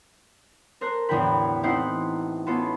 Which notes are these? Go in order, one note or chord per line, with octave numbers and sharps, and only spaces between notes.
A4 A#4 C5 A#5 F#6
A1 E2 D3 A#4 G5 B5
A3 C4 D#4 E4 C5 F#5
B3 C#4 F4 A4